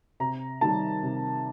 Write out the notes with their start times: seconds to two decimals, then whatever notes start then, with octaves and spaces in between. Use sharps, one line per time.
0.20 C3 A#5
0.61 D#3 G3 A5
1.03 C3